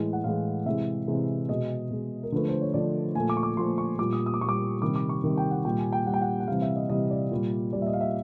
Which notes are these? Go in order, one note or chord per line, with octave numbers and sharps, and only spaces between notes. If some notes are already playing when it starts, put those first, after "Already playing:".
Already playing: A2 E3 G#3
F#5
A2 E3 G#3 F5
C3 E3 G#3 E5
C3 E3 G#3
B2 G#3 D#5
B2 G#3
A#4
D3 F3 A3 B4
C5
C#5
D3 F3 A3 D5
A#2 F3 A3 G#5
D6
C#6
D6
A#2 F3 A3 C6
C#6
A#2 G3 D6
D#6
D#6
D6
A#2 G3 C#6 D6
C3 D#3 G3 D6
D6
C#6
C3 D#3 G3
G5
F#5
A#2 G3 G5
G#5
G5
A#2 G3 F#5
G5
F#5
F#5
C3 E3 G3 F5
E5
D#5
C3 E3 G3 D#5
D5
A#2 G3
A#2 G3 D5
E5
D#5
F5
E5